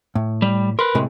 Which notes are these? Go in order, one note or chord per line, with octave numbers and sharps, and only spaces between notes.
A2
G3
A#4 B4 C6
A2 C3 G#3